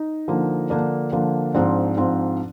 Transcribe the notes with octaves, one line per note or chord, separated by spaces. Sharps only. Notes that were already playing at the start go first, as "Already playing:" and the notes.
Already playing: D#4
D3 F3 A#3
D3 F3 A#3 D4
D3 F3 A#3
G#2 F3 C4 D4
G#2 F3 C4